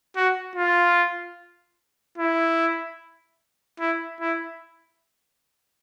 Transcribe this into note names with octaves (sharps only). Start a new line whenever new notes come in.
F#4
F4
E4
E4
E4